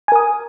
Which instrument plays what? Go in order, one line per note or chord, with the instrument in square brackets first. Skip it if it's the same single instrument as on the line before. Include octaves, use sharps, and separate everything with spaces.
[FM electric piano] G#5
A#4
D#6